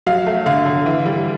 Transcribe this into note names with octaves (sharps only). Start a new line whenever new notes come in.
F#3 F5
A3
D3 F5
D3
E3
G3